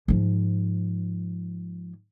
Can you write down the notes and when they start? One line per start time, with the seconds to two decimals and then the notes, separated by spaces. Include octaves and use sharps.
0.08 G#2 F3